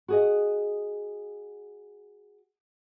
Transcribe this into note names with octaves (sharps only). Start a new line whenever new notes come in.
F#4 G#4 D#5